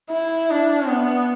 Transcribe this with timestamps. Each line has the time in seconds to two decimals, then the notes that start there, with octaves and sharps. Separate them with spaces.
0.10 E4
0.50 D4
0.88 B3